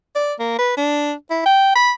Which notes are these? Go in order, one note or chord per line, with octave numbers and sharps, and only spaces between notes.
D5
A#3
B4
D4
E4
G5
B5